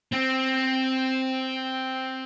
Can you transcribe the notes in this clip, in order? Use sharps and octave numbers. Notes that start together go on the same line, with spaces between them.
C4